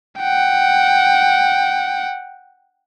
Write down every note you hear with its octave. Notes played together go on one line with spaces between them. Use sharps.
F#5 G5